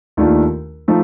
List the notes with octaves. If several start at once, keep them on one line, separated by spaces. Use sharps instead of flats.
D#2 D#3 A3 D4 F4
F3 A3 D#4